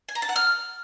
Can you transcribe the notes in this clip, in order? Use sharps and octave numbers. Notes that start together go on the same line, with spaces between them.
G#5
A#5
A5
F#5
F6